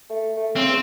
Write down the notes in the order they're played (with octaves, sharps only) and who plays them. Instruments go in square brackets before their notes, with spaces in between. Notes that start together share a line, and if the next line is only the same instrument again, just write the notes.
[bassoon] A3
A3
[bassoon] C#3 [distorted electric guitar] C4
[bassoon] E2